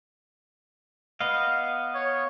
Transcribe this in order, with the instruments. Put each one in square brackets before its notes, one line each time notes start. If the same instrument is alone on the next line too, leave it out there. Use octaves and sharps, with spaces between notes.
[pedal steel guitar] B3 D#5 F5
[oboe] C#5